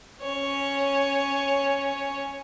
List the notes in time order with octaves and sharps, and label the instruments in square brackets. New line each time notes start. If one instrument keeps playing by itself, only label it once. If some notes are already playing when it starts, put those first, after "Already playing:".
[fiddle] C#4 C#5